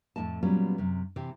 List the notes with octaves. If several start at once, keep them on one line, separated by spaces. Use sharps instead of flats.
F2 A2 B3 D#5 A5
A#2 F#3 G3 B3 C#4 F4
F#2 C3
C3 E3 C4